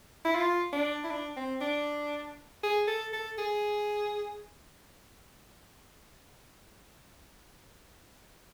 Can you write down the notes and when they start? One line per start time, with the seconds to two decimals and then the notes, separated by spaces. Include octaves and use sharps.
0.25 E4
0.35 F4
0.72 D4
1.04 E4
1.10 D4
1.37 C4
1.61 D4
2.63 G#4
2.88 A4
3.13 A4
3.38 G#4